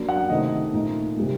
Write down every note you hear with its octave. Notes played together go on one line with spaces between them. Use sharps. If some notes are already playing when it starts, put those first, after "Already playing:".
Already playing: F#3 A#3 D4
F#5
C3 D#3 A3 C4 D#4 D#5
A#2 A3 D#4
C3 G3 A#3